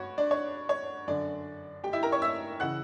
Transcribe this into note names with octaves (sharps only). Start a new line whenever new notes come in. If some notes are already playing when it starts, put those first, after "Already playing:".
Already playing: G2 F#4 C#5
D4 D5
C#5
C#5
F#2 D3 D4 D5
G4 G5
E4 E5
A#4 A#5
C#5 C#6
E5 E6
C#3 E3 F#5 F#6